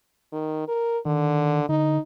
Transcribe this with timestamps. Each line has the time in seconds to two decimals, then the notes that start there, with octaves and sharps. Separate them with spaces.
0.32 D#3
0.68 A#4
1.05 D3 D#3
1.69 D3 D#4